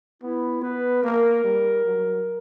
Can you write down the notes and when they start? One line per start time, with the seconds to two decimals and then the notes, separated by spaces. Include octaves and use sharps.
0.22 B3 E4
0.62 B3 B4
1.03 A#3 A#4
1.44 G3
1.85 F#3